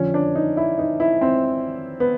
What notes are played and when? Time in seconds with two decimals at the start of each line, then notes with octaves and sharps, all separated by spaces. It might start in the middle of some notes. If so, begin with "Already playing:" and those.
Already playing: F2 D3 F3 C#4
0.14 D4
0.35 D#4
0.57 E4
0.79 D#4
1.00 E4
1.21 C4
2.00 B3